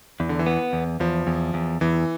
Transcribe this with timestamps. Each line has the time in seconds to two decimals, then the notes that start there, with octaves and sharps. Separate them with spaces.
0.20 E2 E3
0.29 D3
0.39 E3
0.46 B3
0.73 E2
1.00 E2 F3
1.27 E2
1.54 E2
1.81 E2 E3